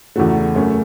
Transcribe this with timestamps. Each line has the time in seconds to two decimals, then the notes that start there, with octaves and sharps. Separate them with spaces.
0.16 E2 C#3 A3 F#4
0.55 F#2 C#3 A3 C#4